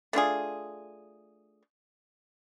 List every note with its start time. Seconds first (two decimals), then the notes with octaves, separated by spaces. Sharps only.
0.13 A3 D4 F4 G#4